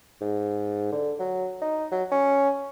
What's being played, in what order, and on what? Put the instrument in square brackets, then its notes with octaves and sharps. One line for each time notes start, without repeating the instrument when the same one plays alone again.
[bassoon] G#2
D3
F#3
D#4
F#3
C#4